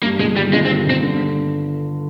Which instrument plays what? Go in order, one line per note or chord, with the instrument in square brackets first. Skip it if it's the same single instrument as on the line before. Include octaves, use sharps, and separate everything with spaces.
[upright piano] G2 [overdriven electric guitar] A#3
[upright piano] G1 [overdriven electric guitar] G#3
[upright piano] D#3 [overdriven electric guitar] G3
[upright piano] G1 [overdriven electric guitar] G#3
[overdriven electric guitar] C4
[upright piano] G2
[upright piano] G1 [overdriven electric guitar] C4
[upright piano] D3